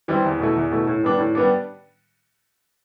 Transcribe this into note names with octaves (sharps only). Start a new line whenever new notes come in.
E3 G3 C4 E4
E2
B2 A3 E4
E2
B2 A3 E4
A2
G3 B3 D4
A2
G3 B3 D4